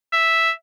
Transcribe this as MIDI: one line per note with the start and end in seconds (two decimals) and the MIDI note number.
0.12 0.51 76